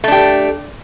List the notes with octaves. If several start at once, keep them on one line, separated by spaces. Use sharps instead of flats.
A3 D4 G4